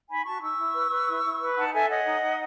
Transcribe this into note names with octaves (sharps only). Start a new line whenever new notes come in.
D#4 G#5 B5
F#4 A5 C#6
D#4 C#6 E6
E4
B4
B4
E4
E4
B4
D#4 F#5 A5
A4 E5 G#5
C#5 D#5 F#5
D#4
D#4